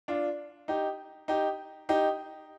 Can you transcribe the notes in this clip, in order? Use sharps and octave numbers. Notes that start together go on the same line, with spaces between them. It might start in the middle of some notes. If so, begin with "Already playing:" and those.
D4 F4
D#4 G4
D#4 G4
D#4 G4